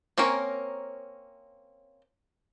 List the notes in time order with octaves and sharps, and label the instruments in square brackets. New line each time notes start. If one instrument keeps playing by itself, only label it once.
[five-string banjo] A#3 C4 C#4 A#4 C#5